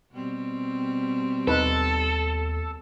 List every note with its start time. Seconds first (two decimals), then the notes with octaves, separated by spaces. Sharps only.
0.11 B2 G3 C4
1.47 D#2 D#4 A4 B4